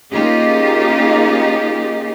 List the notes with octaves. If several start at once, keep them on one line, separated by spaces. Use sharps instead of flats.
A#3 C#4 D#4 F4 G4 G#4